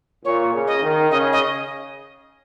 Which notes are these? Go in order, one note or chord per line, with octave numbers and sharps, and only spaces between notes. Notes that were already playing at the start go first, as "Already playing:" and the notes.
A#2 C#5
C#3
D#5
D#3
C#3 D#5
D#5